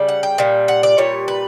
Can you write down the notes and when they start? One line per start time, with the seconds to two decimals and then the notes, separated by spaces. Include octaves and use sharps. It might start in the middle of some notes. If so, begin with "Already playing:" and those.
Already playing: C#3 G3
0.08 F#5
0.23 G5
0.38 A#2 G3
0.68 F#5
0.83 D5
0.98 A#2 G3 C#5
1.28 B4